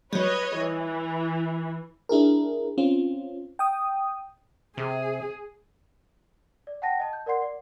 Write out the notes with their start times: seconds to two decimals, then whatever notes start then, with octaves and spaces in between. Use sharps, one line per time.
0.13 F#3 G3 B4 C#5 D#5
0.56 E3
2.09 D4 E4 G#4 A#4
2.78 C4 C#4 F4
3.59 G5 D#6
4.77 C3 G#4
6.67 D5
6.82 F#5 G5 A5 A#6
7.00 D#5 A5
7.13 G6
7.26 A#4 D5 F#5 C6 C7
7.42 D5